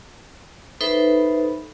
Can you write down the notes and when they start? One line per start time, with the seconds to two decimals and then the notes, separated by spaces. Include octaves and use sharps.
0.81 D#4 A4 B4 C5 E5 B5